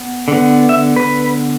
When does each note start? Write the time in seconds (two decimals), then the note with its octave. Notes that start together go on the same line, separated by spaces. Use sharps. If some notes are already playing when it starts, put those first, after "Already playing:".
Already playing: B3
0.28 D3 B3
0.69 E5
0.96 B4